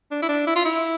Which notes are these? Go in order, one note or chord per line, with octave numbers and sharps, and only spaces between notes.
D4
E4
D4
E4
F4
E4